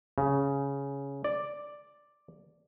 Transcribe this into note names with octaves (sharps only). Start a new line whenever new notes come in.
C#3
D5